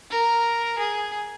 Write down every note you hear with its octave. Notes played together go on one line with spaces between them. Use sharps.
A#4
G#4